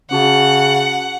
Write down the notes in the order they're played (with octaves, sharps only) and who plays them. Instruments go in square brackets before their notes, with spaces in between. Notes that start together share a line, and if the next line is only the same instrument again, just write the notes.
[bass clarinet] C#3 [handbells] C#4 F#4 A5 [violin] F#5